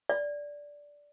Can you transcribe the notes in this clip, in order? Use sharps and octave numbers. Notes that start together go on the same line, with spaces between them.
D5